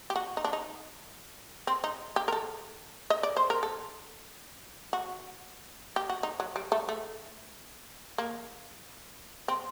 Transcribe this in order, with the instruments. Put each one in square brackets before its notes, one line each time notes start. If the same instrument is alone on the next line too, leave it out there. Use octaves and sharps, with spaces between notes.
[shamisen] G4
F#4
D#4
D4
D#4
C4
D#4
G4
A#4
A4
D#5
D5
C5
A#4
A4
F#4
G4
F#4
D#4
F#3
G3
A3
A3
A#3
C4